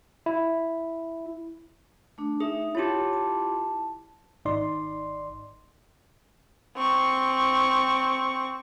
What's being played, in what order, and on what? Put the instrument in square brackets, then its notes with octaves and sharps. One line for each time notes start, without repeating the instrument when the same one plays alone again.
[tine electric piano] E4
[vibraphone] A3 D4
[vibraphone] D#4 E5 [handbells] G#4
[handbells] E4 F4 G4 [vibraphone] C#5 A5
[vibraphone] A5
[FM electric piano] G#1 D#4 D5 C6
[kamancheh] C4 C#6